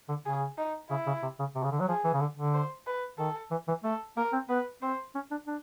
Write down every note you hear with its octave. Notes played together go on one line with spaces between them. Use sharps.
D3
C#3 G#4
D#4
C#3 E4
C#3
C3
C#3
C3
C#3
D3
F#3
F3 G#4
E3
C#3
D3
D3
C5
B4
D#3 A4
E3
E3
A3 A4
A#3 A#4
C4
B3 B4
C4 C5
C#4
D4
D4